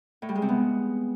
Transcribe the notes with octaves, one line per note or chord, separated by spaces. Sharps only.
A2
G3
G#3
C3
B3